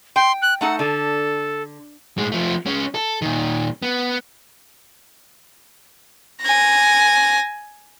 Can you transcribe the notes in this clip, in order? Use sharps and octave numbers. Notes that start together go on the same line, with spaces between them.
G5 C6
F#6
A3 D#4 A4 F#5
D3 A4
A2 G#3
F3 A3
G#3 C#4
A4
A#2 D#3
B3
G#5 A#6